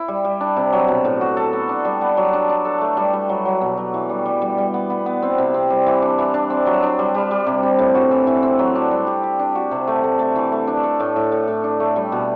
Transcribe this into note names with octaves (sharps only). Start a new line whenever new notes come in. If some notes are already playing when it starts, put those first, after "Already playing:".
Already playing: E4
G3
G3
D4
C3
F#3
B2
A2
F#4
A4
B3
D4
G3
B3
F#3
D4
D4
A4
A3
G3
G3
F#3
F#3
B2
F#3
E3
G3
G3
G3
G3
B3
B3
B3
C4
C3
C4
G3
E3
D4
E3
D4
C4
F#3
D4
G3
G3
G3
C3
C3
A2
F#4
E3
E3
C4
F#3
D4
G3
G4
G4
D4
F#4
C3
A3
A3
A3
E3
A3
D4
A4
A2
A2
A2
A2
D4
A3
G3
B2